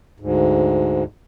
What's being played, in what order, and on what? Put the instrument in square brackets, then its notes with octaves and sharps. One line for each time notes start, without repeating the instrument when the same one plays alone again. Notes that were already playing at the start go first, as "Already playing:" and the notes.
[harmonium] D2 G#2